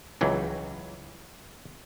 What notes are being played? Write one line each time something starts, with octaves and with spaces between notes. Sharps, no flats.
C#2 E3 F#3